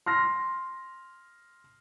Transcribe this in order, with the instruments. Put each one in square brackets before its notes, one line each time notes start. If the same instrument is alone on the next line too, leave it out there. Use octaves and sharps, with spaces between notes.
[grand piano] C6 F6 A#6